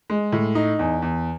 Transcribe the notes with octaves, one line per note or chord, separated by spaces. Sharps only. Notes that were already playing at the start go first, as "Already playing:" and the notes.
G#3
A2
D#4
E2
E2